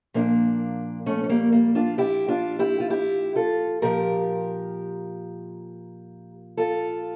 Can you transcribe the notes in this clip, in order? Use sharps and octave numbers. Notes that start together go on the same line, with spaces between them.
A#2 F3 A#3 D4
A3 C#4
C#4
G3 A#3
G3 A#3
D4 F4
E4 G4
D4 F4
E4 G4
F4
E4 G4
F4 A4
A#2 F3 G4 A#4
F4 A4